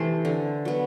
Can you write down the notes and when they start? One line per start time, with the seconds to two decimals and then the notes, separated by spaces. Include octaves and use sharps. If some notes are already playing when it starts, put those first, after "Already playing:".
Already playing: C3 E3 A3 C5
0.25 D3
0.65 F#3 B3